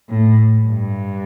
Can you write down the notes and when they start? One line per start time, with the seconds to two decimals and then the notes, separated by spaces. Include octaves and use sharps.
0.10 A2
0.67 G2